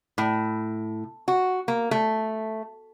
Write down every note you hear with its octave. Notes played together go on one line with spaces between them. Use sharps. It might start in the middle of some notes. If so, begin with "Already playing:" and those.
A2
F#4
A#3
A3